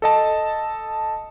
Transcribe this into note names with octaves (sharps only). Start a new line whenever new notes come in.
A4 D#5 A5